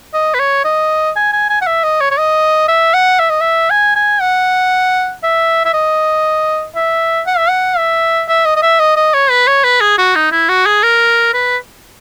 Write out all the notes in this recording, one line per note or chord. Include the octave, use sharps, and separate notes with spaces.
D#5
B4
C#5
D#5
G#5
G#5
G#5
F#5
E5
D#5
C#5
C#5
D#5
E5
F#5
E5
D#5
E5
G#5
G#5
F#5
E5
E5
D#5
E5
F#5
E5
F#5
E5
E5
D#5
D#5
E5
D#5
D#5
C#5
B4
C#5
B4
G#4
F#4
D#4
E4
F#4
G#4
A#4
B4